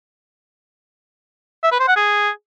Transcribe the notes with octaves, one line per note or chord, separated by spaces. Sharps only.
E5
B4
C5
F#5
G#4